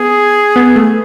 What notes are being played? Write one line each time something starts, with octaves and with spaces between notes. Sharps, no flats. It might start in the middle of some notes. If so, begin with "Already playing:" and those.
Already playing: B3 G#4
B3
A3